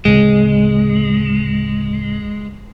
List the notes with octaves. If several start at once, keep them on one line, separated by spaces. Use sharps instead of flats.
D1 C#3 G#3 C4